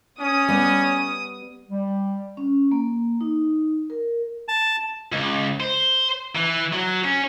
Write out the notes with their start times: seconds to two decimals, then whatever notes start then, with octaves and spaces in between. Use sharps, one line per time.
0.20 C#4 D#6
0.49 G3 B3
1.71 G3
2.37 C#4
2.71 A#3
3.21 D#4
3.90 A#4
4.48 A5
5.12 C#2
5.60 C5
6.36 E3
6.73 F#3
7.04 C#4